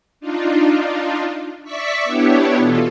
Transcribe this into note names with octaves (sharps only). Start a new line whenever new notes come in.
D4 D#4 F4
D5 E5 C#6 B6
B3 D4 E4 G4 C#5
B2 E3 F4 A4